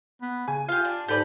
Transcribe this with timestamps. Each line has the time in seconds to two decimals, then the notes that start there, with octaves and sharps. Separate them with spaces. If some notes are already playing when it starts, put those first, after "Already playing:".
0.22 B3
0.48 C#3 G#5
0.69 F4 G4 F5
0.85 D4
1.08 G#2 G4 A4 B4 D5